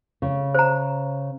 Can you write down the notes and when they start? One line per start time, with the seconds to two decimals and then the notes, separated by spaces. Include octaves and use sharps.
0.22 C#3
0.54 C5 A#5